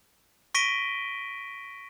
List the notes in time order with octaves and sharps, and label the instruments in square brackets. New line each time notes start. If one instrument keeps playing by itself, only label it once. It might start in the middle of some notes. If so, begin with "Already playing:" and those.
[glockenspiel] C#6 A#6 B6 D7 D#7 G7